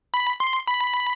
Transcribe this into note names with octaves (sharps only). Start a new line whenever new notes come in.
B5
C6
B5